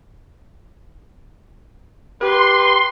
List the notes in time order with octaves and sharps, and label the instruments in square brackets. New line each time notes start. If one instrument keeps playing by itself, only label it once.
[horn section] G4 B4 [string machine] C6